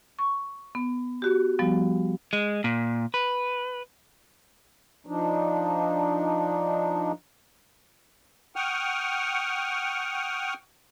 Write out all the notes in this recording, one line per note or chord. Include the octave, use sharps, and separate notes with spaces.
C#6
B3
F#4 G4
F3 G3 B3
G#3
A#2
B4
F3 D4 D#4
F#5 G5 C#6 D#6 F6